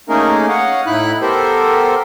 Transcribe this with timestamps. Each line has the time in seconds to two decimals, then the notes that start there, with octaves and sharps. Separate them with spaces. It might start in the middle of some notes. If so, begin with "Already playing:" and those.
0.09 A3 A#3 C#4 D#4 G#4 A#4
0.48 C#5 D#5 F5 F#5
0.86 A2 D#4 E4 B5 F#6
1.21 B3 G4 A4 A#4 C5